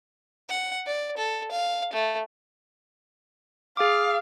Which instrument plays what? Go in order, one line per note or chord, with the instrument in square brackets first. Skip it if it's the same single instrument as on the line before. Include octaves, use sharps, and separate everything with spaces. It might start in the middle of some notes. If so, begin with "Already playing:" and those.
[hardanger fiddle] F#5
D5
A4
F5
A3
[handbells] G#4 D6 [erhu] F5